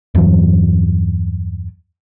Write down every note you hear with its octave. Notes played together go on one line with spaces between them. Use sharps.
E2 G2 E3 F#3